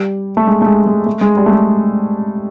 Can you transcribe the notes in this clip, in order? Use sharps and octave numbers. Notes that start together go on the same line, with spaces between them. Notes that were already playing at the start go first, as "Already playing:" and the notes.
Already playing: G3
A3
G#3
A3
G#3
G#3
A3
G#3
G3
A3
G#3